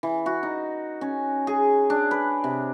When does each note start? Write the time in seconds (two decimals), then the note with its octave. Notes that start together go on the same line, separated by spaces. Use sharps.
0.03 E3
0.26 F#4
0.43 D#4
1.01 C#4
1.47 G#4
1.90 D4
2.11 B4
2.44 C3